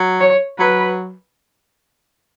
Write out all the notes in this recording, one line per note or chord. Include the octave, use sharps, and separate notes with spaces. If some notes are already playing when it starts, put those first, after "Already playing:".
Already playing: F#3
C#5
F#3 B4